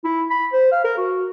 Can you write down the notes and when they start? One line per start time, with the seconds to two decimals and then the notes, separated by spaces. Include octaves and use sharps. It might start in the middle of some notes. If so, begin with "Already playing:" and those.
0.05 E4
0.30 B5
0.53 C5
0.72 F5
0.85 A#4
0.97 F#4